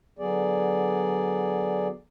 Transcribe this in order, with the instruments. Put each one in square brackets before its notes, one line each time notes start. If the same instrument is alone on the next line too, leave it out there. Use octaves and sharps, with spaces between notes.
[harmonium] D3 F#3 B3 G#4 D5